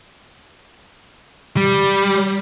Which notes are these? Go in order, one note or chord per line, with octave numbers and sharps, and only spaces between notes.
G3